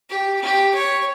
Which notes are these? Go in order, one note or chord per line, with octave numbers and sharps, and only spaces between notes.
G4
G4
C#5